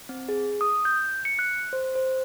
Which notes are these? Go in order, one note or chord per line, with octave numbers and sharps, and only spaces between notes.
C4
G#4
D#6
G6
C#7
F#6
C5
C5